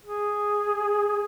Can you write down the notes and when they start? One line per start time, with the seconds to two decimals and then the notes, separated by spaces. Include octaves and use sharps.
0.04 G#4